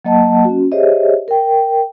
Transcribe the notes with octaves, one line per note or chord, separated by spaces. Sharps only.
F#3 A#3 D#5 F#5 A5
C#4 F#4
G4 G#4 C5 C#5 D#5 E5
A#4 G5